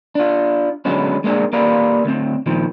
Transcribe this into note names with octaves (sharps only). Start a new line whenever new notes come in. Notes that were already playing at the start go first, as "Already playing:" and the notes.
D4 F4
D3 F#3 G#3 B3 C#4
G#3 A#3 B3 D4 G#4
A#3 G4 A#4 B4 D5 F5
D2 C4
A#2 D#3 F3